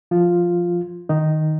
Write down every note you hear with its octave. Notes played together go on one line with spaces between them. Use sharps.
F3 F4
D#3 D#4